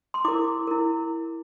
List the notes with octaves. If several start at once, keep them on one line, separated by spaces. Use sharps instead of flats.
C6
E4 A#4 D6
E4 A#4